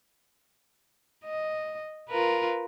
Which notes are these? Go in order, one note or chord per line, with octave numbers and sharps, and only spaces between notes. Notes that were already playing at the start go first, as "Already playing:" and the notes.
D#5
F4 A#4 B4